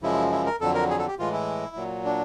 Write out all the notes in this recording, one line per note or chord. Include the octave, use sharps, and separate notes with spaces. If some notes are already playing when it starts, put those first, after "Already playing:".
F#2 C#3 F3 G#3 E4
E4
A#4
F2 D3 F#3 A4
A#4
G#4
A4
G4
A2 E3 G#3 F4
E4
A#2 F#3
D4